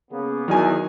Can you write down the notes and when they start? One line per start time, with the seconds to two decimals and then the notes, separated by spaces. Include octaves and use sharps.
0.11 C#3 A#3 B3
0.48 E2 D#3 F#3 G#5